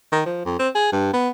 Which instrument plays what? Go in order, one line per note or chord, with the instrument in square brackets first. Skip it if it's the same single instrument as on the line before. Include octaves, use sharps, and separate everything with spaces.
[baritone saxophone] D#3
F3
F2
C4
G#4
G2
B3